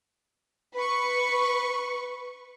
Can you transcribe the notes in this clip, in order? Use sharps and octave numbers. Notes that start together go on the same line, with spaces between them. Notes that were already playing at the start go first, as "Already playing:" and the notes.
B4 C#6